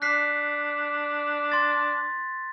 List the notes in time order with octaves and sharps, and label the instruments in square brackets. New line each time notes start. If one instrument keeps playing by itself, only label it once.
[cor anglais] D4 [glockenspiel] F#6 B6 C7
[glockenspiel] C6 A6